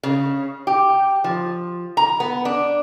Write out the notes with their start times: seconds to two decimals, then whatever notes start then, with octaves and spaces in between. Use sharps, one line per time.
0.03 C#3
0.67 G4
1.24 F3
1.97 A#5
2.20 B3
2.45 D4